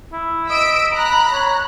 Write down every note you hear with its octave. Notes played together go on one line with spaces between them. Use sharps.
E4
D#5 E6 B6 D7
A#5 B5 F#6
C#5